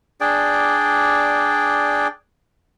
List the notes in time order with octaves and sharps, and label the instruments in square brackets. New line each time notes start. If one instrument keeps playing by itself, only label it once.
[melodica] D4 G#4 D5 G5